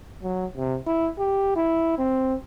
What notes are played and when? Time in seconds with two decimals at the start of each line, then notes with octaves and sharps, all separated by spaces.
0.23 F#3
0.57 C3
0.87 E4
1.18 G4
1.56 E4
1.98 C4